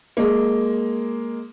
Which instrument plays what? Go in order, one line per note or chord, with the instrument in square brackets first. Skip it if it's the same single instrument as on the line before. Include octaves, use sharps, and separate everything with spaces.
[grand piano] G#3 A#3